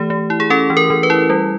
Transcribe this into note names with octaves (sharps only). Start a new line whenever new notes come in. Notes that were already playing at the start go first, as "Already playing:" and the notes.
Already playing: E3 A3 G4
A3
E4
G#4
C#4 A4
E3
A#4
E3
B4
E4
G3